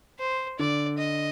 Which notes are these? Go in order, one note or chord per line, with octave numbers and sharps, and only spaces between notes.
C5
D3 D5
D#5